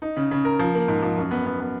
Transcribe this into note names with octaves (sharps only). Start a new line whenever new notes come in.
D#4
C#3
C#3
A#4
F3
A#3
G#2
F3
F#2
B3
B3
B3